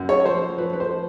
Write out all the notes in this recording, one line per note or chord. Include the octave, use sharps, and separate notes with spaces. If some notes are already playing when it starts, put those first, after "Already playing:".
Already playing: F#2
C#5
F3 C5
F3 B4
B4
C5
F3